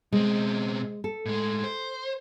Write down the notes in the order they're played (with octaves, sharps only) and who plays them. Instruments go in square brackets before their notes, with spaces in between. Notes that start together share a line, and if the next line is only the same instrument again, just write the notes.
[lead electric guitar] B2 C4 [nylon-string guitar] G#3
[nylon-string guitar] A4
[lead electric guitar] A2 G#3
C5